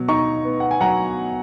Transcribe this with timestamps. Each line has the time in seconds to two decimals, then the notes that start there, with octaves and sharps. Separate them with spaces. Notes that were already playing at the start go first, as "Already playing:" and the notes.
Already playing: B2 F#3
0.08 D#4 A#5 C#6
0.45 B3
0.60 F#5
0.71 G#5
0.81 F#3 F#5 A#5